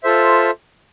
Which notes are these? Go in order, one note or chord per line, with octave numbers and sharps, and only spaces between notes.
F4 A4 C5 E5